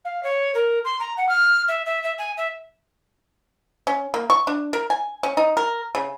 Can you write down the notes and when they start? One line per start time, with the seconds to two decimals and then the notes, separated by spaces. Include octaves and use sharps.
0.05 F5
0.23 C#5
0.54 A#4
0.84 C6
1.00 A#5
1.17 F#5
1.28 F6
1.68 E5
1.85 E5
2.03 E5
2.18 G#5
2.37 E5
3.87 C#4
4.14 A#3
4.30 C#6
4.47 D4
4.73 A#4
4.90 G#5
5.23 C#4
5.37 D#4
5.57 A#4
5.95 C#3